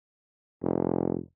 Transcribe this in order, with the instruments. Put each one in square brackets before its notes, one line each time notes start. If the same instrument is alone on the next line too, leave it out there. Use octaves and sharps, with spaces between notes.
[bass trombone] F1